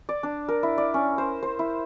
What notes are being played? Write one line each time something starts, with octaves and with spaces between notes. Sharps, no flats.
D5
D4
A#4
E4
D5
C#4
C5
C5
E4